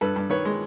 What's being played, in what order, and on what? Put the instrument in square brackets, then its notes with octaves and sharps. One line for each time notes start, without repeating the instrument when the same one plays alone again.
[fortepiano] G2 A4 B4
G2
D#3 B4 C#5
G#3